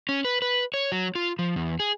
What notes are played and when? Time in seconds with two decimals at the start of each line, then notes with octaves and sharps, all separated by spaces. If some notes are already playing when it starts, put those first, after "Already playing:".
0.09 C#4
0.25 B4
0.42 B4
0.74 C#5
0.92 F#3
1.15 F4
1.39 F3
1.56 E2
1.80 G#4